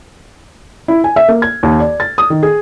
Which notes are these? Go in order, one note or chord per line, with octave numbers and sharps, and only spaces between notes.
E4
G#5
E5
A#3
G#6
D#2
D5
A6
D#6
D#3
G#4